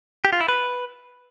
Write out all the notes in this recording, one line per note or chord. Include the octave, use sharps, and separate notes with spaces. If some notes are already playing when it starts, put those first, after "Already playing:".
G4
F4
E4
B4